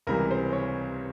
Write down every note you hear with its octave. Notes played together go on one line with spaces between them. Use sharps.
C#2 C3 E3 G3 A#4
C5
C#5